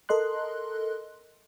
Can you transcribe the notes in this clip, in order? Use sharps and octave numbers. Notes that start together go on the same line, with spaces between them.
A4 A#4 D#5 C6 F#6